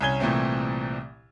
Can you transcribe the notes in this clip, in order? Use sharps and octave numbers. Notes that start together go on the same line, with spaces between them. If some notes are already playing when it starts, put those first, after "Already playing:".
C2 C#4 G#5 G#6 G7
C2 A#2 E3 A3 C4